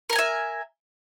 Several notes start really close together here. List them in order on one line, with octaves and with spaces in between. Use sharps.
A#4 A#5 G#5 E5